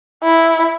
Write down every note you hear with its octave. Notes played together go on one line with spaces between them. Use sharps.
E4